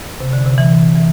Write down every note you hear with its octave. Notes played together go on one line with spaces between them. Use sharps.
C3
D3
C3
E3
E3